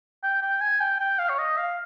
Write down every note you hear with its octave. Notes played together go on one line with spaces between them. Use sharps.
G5
G5
G#5
G5
G5
F5
C#5
D#5
F5